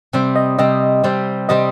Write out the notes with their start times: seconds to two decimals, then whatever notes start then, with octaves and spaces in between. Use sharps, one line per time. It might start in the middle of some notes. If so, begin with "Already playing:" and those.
0.13 C3 G3 C4
0.36 D#5
0.59 C3 G3 C4 D#5
1.04 C3 G3 C4
1.49 C3 G3 C4 D#5